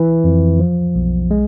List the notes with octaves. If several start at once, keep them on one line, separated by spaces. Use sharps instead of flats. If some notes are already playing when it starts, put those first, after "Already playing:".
Already playing: E3
F2
F3
B1
G#3